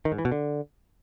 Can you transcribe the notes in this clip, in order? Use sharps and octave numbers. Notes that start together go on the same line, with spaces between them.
D#3
G#2
E3
B2
D3